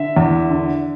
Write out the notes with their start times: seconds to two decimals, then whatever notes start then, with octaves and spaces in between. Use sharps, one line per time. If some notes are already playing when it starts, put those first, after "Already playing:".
Already playing: D3 E5
0.17 E2
0.49 D3